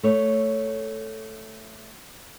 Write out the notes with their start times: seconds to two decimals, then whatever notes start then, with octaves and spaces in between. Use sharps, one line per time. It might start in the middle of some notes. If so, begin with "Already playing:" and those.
0.03 A3 C#5